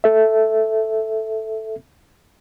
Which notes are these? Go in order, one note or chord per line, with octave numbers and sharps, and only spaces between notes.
A4 E5